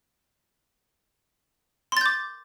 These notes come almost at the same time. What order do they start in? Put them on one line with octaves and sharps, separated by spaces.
C6 A6 G6 D6